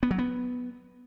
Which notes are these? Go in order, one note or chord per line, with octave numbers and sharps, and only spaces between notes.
B3
F#3
B3